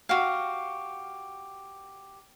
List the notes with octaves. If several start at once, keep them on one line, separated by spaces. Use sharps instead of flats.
F#4 G4 F5